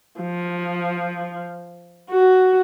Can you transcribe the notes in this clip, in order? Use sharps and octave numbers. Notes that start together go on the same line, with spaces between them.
F3
F#4